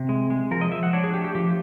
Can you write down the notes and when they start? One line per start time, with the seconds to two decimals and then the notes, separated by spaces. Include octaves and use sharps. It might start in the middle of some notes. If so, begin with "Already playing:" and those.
Already playing: C3
0.09 G#3
0.30 G#3
0.51 F3 A#4
0.61 D#5
0.72 F3 E5
0.83 F#5
0.93 D4 C#5
1.04 G#4
1.14 A3 G4
1.24 G4
1.35 F3 G4